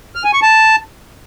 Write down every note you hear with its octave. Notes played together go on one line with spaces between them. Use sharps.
F6
G#5
C#6
A5